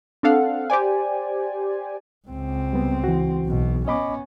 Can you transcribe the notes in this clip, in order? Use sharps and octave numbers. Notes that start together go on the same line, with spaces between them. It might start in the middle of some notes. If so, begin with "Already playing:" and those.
C4 D4 A4 F5 F#5
G4 C5 D5 G#5
C#2 C4
G3 B3
E3 F#4
B1 B2
B3 C#4 D#5 B5 D6